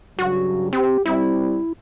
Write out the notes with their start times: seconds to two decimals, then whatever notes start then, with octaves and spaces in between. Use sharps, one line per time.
0.19 G2 C#3 F#3 F#4
0.73 C4 G4
1.05 G3 C4 E4